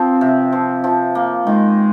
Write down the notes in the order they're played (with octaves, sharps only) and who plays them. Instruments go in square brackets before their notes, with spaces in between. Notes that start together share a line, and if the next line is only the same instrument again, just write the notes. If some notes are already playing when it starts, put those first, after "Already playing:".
Already playing: [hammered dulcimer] F3 [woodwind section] C4
[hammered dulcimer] C3
F3
F3
A#3
[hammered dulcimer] D#3 [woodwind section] G#3